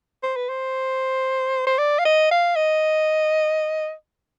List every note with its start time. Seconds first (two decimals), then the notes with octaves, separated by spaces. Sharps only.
0.23 C5
0.36 B4
0.49 C5
1.67 C5
1.78 D5
1.99 F5
2.05 D#5
2.31 F5
2.56 D#5